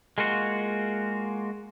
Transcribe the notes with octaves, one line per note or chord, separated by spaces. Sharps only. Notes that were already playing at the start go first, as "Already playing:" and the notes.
G#3 A#3 F4 F#4